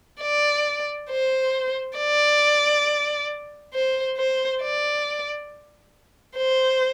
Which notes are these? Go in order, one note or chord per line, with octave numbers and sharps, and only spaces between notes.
D5
C5
D5
C5
C5
D5
C5